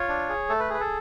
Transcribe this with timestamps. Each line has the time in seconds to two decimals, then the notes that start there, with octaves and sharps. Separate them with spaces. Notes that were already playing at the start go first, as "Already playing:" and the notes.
Already playing: F4 C#5
0.09 D4
0.29 G#4
0.49 A3 A4
0.60 B4
0.70 G#4 B4
0.80 A4